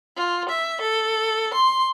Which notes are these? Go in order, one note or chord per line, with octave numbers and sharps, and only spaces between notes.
F4
E5
A4
C6